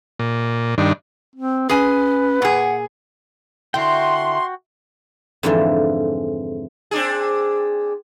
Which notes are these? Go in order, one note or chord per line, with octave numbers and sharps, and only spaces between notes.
A#2
G2 D#3 D4
C4
C#4 G#4 B4 G#5
A#2 G#4 F#5
D3 D4 E4 F#4 G5 C6
F2 G#2 D3 E3 F3
C4 D4 G#4